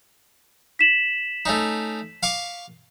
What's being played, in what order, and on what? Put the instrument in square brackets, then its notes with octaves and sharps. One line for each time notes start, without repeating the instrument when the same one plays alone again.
[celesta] B6 E7 F#7
[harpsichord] A3 C#4 D#4
F5 C#6 D6